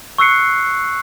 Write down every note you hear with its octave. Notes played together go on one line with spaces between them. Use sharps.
C#6 E6 F#6 C7 C#7